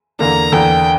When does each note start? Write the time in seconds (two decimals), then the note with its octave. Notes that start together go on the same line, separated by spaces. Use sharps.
0.19 E2 D3 A#3 D4 A#5
0.52 E2 D3 A#3 D4 G5